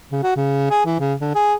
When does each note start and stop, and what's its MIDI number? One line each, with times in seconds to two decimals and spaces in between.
0.12 0.21 49
0.23 0.35 66
0.36 0.70 49
0.70 0.81 68
0.86 0.98 52
0.99 1.14 49
1.21 1.32 50
1.35 1.54 68